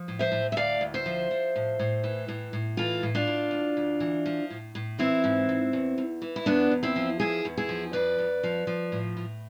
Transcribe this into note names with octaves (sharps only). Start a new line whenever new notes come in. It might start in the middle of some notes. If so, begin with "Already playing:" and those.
Already playing: F3
A2
C5 E5
A2
E5
D2 D5 F5
D2
C5 E5
F3
F3
A2
A2
E3
A2
A2
E3 F4 A4
A2
D4 F4
A2
D2
D2
E3
F3
A2
A2
E3 C4 E4
G#2
G#2
E2
E2
E3
E4
E2 B3 D4
E2
C4 E4
F3
E2 E4 G#4
E2
E4 G#4
F3
F2 B4 D5
F2
F3
F3
A2
A2